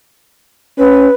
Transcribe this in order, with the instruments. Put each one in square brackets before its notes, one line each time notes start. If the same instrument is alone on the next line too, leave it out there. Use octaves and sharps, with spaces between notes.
[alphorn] C#4 [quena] B4